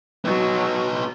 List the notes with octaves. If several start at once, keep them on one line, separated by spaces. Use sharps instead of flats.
F#3 B3 D#4